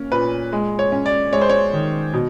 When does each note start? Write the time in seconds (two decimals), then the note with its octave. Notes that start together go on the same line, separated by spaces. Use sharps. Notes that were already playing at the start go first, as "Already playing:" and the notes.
Already playing: A#3 C#4
0.12 A#2 B4
0.52 G#3
0.79 C#5
0.92 C#4
1.06 D5
1.33 G#3 C#5
1.41 C5
1.50 C#5
1.73 D#3
2.13 B2